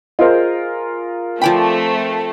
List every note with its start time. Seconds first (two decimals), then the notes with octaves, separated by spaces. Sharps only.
0.19 F4 G#4 A#4 C5 D#5
1.42 F3 A3 C4 D5 G5 G#5 B5